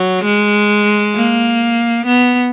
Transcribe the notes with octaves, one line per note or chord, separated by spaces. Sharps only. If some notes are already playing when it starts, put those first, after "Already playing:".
Already playing: F#3
G#3
A#3
B3